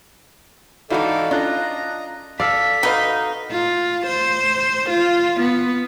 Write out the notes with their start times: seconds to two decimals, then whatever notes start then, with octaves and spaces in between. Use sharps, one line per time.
0.90 G#2 E3 D#4 E4 F#4 A4 D5 F5
1.31 C#4 D4 F4 D#5 A#5 F#6 A#6
2.40 A4 D5 F5 B6
2.83 D#4 F#4 B4 F5
3.52 F4
4.06 C5
4.90 F4
5.41 B3